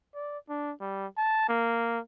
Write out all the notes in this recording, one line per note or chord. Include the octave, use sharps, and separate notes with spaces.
D5
D4
G3
A5
A#3